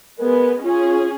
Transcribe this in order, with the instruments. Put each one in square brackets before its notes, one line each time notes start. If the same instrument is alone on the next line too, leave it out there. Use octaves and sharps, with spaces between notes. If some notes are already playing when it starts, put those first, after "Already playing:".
[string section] G#3 B3 [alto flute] A#4
[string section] C#4 G#4 [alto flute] F4